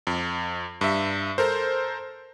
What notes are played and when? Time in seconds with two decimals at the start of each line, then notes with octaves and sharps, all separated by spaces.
0.07 F2
0.81 G2 E5
1.38 A4 A#4 C5